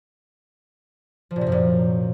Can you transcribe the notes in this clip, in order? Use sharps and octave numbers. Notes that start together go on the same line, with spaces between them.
F3
A#2
C3
F#2
A#2